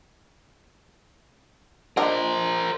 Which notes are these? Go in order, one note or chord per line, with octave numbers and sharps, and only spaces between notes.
D4 D#4 A#4 C5